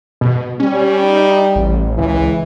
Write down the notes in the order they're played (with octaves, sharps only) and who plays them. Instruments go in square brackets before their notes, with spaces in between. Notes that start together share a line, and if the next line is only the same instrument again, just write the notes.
[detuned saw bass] B2
[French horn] G3 [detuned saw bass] C#4
[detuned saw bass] D#4
A1
[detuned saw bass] C#2 [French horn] E3